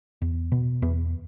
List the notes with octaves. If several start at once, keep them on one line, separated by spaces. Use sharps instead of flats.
E2
B2
E2 B3